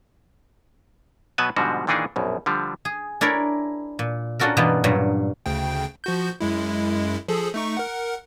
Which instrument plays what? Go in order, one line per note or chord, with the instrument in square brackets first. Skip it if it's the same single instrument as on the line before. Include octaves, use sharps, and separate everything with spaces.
[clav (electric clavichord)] B2 F#3 B3 B4 G#5 A5
G#2 B2 D3 F3 G3 F#4
A#2 D#3 E3 D4 D#4 G#4
A#1 F#2 B2
D3 F3 G3
[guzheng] G#4
D4 E4 A#4 C#5 D5
A#2
C#4 D4 F4 F#4 A4 A#4
G2 B2 E3 A#3 B3 F4
G2 A#2 F#3
[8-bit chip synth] D2 C#3 G5
F3 F#4 G6
F#2 G#3 E4
F3 G#4 A4
A3 D#4 C#6
A#4 F#5